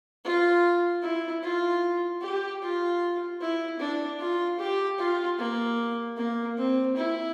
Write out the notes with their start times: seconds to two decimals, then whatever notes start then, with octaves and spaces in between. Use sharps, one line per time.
0.24 F4
1.02 E4
1.43 F4
2.21 G4
2.62 F4
3.41 E4
3.79 D4
4.20 F4
4.59 G4
4.99 F4
5.39 A#3
6.17 A#3
6.57 C4
6.97 E4